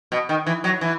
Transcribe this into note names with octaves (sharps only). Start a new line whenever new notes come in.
B2
D#3
E3
F#3
E3